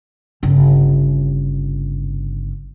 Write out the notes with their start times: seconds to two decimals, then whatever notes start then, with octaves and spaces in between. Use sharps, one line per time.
0.43 G1 C#3